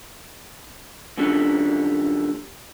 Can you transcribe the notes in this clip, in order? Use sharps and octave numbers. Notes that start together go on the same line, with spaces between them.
F#2 A#2 D3 G3